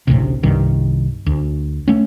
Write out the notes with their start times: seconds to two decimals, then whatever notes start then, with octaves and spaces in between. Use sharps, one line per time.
0.07 A1 D2 A2 C3
0.43 C2 G2 D#3
1.26 D2
1.88 A3 C#4